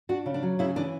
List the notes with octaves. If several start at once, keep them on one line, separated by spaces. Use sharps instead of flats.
D4 F#4
C#3
D4
F#3
C#3 E4
E3 D4